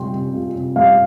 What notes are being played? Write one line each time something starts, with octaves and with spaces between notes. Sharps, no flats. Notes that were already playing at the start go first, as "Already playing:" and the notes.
Already playing: C3 G3 F4 G5 C6
C3
F4
C3
G3 F5